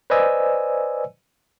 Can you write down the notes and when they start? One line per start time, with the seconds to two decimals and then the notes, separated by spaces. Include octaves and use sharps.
0.10 B4 C5 D5 D#5 G#5 E6